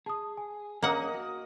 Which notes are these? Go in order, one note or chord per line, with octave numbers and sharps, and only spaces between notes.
G#4 A5 D#6
G#5
A#3 C#4 D4 G#4 A#4 D#5 F#5
F#4